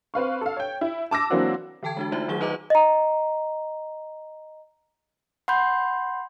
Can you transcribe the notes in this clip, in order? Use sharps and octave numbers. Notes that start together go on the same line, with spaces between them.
C4 B4 F5 C#6
A4 F5
C#5 G5
E4
A5 D6 E6 A#6
E3 F#3 A#3 C4 D4 F#4
D3 E3 A4 G5 A5 G#6
G#3 D4 F#4
A3 D#4 F4 C5 E5
D#3 F#3 G#4 F#5 G7
D#4 B4 D#5 A#5 D6
D#5 A#5
F#5 B5 C6 G6